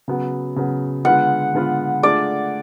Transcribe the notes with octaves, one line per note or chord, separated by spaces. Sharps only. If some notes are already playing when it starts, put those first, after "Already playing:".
C#3 F#3 B3
C#3 F#3 B3
D3 G#3 B3 F4 B4 F#5
D3 G#3 B3 F4 B4
A3 D4 F4 G#4 D5